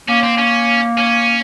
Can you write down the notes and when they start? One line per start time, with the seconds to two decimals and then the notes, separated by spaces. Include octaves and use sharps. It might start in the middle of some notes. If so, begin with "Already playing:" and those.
0.08 A#3 C#4
0.23 C4
0.38 C#4
0.98 C#4